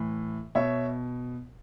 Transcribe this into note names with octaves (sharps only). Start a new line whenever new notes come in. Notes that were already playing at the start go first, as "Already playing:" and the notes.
Already playing: A2 E3
B2 C#5 E5